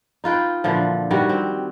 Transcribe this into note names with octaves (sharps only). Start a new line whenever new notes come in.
D#4 F4 B4 G5
A#2 D3 E3 F3
D#3 E3 G3 F#4
C4